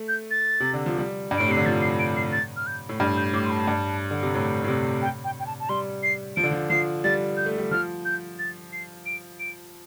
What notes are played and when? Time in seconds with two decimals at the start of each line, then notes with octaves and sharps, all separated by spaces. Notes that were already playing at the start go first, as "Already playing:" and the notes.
Already playing: A3
0.08 G6
0.31 A6
0.60 C3
0.74 D3
0.86 F3
0.98 G3
1.31 G2
1.38 A2 D7
1.49 C3 C7
1.57 D3
1.66 F3 A6
1.82 C7
1.99 D7
2.17 C7
2.32 A6
2.57 F6
2.67 G6
2.89 A2
3.00 G2 F6
3.17 G6
3.33 A2 D6
3.45 C6
3.51 A5
3.68 G2
4.11 D3
4.23 C3
4.35 A2
4.64 A2
4.68 C3
5.02 G5
5.24 G5
5.40 G5
5.47 A5
5.60 A5
5.69 G3 C6
6.03 C7
6.36 F3 D7
6.43 D3
6.51 F3
6.70 F3 C7
7.04 G3 A6
7.37 G6
7.46 A3
7.58 G3
7.71 F3 F6
8.05 G6
8.39 A6
8.73 C7
9.06 D7
9.40 D7